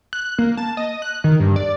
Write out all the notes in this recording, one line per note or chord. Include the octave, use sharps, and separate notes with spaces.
F#6
A#3
A5
D#5
F#6
D#3
G2
D5